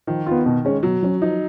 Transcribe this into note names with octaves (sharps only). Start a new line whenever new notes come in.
D#3 F3
B3 F4
B2
G#3 C#4
B2 F#3
F#3 C#4
F3 D#4